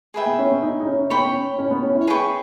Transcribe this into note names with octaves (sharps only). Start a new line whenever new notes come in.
G#4 B4 E5 G5
B3
C#4
B3
D#4
D#4
C#4
B3 C#5 G5 B5
C#4
C#4
B3
C#4
E4
G#4 B4 G5 C#6